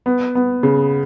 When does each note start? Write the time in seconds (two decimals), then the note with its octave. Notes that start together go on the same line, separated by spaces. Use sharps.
0.06 B3
0.35 B3
0.63 C#3